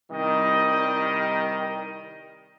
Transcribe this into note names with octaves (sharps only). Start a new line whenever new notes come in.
C2 D#3 G3 D#5